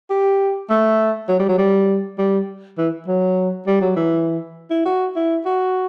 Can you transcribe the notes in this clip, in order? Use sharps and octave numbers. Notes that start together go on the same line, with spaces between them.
G4
A3
F#3
G3
F#3
G3
G3
E3
F#3
G3
F#3
E3
E4
F#4
E4
F#4